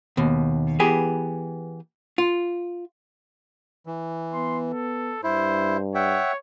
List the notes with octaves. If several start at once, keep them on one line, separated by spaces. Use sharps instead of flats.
D#2 B2
E3 B3 G4 G#4
F4
E3
B3 C6
A4
G2 E4 C5
C#5 E5 F#5 G5